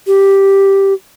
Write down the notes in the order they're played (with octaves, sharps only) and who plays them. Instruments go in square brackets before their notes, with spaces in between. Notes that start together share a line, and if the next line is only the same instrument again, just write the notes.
[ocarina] G4